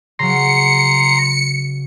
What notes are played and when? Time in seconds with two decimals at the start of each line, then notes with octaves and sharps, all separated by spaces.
0.19 C#3 F#3 A#5 C6 C#7